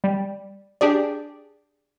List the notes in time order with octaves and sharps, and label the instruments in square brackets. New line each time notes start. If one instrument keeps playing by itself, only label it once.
[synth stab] G3
D4 G4 G#4 D5